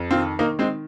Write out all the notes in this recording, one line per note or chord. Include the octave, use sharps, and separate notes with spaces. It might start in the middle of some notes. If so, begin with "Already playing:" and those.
Already playing: F2
D#3 C4 F4
D#3 A#3 D#4
G#3 C4